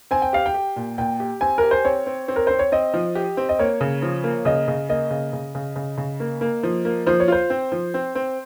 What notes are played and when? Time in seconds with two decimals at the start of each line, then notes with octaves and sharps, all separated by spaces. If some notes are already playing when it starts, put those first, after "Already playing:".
0.11 C4 G#5
0.22 G5
0.33 G4 F5
0.46 G5
0.54 G4
0.76 A#2
0.98 A#2 G5
1.20 G4
1.41 C4 G#5
1.58 G4 A#4
1.71 C5
1.85 C4 C#5
2.06 C4
2.28 C4
2.36 A#4
2.47 C4 C5
2.59 C#5
2.72 C4 D#5
2.94 F3
3.15 G4
3.37 C4
3.49 D#5
3.59 A#3 C#5
3.81 C#3
4.02 F3
4.24 A#3
4.45 C#3 D#5
4.68 C#3
4.89 A#3 D#5
5.10 C#3
5.33 C#3
5.55 C#3
5.76 C#3
5.97 C#3
6.20 A#3
6.41 A#3
6.63 F3
6.85 A#3
7.07 F3 C5
7.20 C#5
7.28 F4 C5
7.50 C4
7.72 F3
7.94 C4
8.15 C4